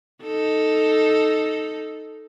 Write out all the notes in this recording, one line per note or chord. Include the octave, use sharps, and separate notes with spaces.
D#4 A4